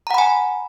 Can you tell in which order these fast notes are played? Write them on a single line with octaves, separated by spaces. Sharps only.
A#5 F#5 B5 G#5